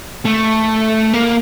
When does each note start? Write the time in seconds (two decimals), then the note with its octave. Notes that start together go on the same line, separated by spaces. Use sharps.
0.25 A3
1.14 A#3